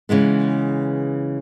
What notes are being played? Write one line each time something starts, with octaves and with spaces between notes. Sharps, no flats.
C#3 E3 G#3 B3